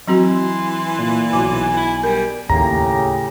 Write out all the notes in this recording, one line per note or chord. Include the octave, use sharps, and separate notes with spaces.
E3 F#3 C4 F#4 C6
C6
A#2
B1 G#5 C6 D6
E4
G3 A#4
D#2 A2 C#3 A#3 G4 A#5